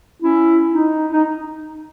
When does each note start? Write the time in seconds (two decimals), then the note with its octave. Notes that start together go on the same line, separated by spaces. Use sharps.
0.22 C#4 E4
0.73 D#4
1.13 D#4